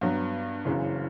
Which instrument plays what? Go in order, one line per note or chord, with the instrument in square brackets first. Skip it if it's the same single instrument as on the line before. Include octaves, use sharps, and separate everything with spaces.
[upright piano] G2 F#3 B3
F#1 F#2 C#3 E3